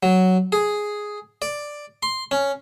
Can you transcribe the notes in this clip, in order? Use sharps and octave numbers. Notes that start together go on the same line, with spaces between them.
F#3
G#4
D5
C6
C#4